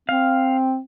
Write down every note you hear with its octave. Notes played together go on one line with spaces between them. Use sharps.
C4 F5